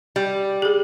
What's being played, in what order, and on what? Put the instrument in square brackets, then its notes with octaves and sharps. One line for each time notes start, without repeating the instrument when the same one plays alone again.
[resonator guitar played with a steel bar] G3
[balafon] G4 G#4